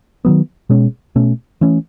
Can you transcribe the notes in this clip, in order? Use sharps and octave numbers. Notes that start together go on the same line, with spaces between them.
D#3 F#3 B3
B2 G#3 C#4
B2 A3 C#4
E3 A3 C#4